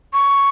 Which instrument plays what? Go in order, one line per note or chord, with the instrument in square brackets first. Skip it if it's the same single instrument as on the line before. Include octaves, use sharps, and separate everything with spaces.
[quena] C#6